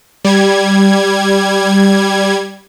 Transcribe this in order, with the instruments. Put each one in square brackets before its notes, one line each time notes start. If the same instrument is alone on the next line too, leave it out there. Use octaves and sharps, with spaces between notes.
[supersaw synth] G3 G#6